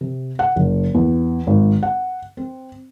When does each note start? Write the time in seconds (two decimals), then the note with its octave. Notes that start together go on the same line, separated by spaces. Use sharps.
0.01 C3
0.39 F#5
0.56 F#1
0.94 E2
1.47 G#1
1.83 F#5
2.37 C4